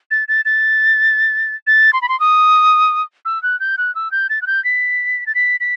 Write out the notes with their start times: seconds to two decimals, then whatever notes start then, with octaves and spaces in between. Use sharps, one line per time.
0.11 A6
0.28 A6
0.45 A6
1.67 A6
1.93 C6
2.02 B5
2.09 C6
2.20 D#6
3.25 E6
3.43 F#6
3.60 G6
3.78 F#6
3.95 E6
4.11 G6
4.30 A6
4.42 F#6
4.47 G6
4.64 B6
5.27 A6
5.35 B6
5.60 B6